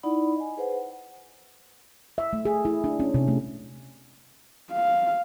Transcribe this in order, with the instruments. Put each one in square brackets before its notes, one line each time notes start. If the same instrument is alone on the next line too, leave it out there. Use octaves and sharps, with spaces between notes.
[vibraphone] D#4 E4 D5 F#5 B5
D#5 G#5
G#4 B4 C5 F#5
F#5
[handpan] E5
A3
G#4
E4
D4
C#4
C3
A3
[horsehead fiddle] F5